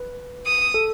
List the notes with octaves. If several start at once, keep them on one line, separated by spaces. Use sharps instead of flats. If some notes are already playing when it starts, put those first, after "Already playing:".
Already playing: B4
D#6
A4